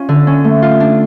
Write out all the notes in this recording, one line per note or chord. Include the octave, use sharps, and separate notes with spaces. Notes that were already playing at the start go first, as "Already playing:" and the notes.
Already playing: C#4 F4
D3
C#4
A3
F4
D4